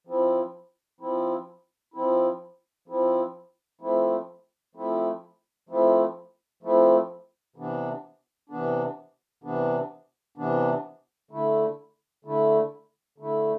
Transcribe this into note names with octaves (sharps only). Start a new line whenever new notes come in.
F3 C4 E4
F3 C4 E4
F3 C4 E4
F3 C4 E4
F3 A3 C4 E4
F3 A3 C4 E4
F3 A3 C4 E4
F3 A3 C4 E4
C3 E3 B3 D4
C3 E3 B3 D4
C3 E3 B3 D4
C3 E3 B3 D4
D3 A3 E4
D3 A3 E4
D3 A3 E4